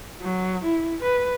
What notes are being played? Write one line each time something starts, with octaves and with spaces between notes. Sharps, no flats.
F#3
E4
B4